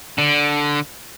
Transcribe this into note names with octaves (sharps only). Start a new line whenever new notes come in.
D3